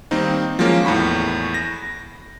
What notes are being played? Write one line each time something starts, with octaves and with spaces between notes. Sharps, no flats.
D#3 G3 A#3 C4 D#4
F3 F#3 G#3 A#3 C#4
E2 A2 B5 C#6
A#6